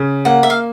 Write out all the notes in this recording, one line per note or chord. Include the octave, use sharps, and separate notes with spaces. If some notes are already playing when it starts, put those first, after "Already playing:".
Already playing: C#3
A#3 F#5
E5
F5